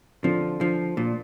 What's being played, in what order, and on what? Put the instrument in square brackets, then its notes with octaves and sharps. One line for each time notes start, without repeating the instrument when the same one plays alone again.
[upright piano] D3 [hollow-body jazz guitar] F3
[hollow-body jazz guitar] F3 [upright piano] D4
[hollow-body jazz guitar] A#2 [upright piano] D4